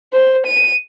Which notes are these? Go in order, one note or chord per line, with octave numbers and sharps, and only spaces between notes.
C5
D#7